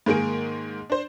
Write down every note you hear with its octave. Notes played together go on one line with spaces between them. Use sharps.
G#2 D#3 A#3 G#4 D7
D4 C5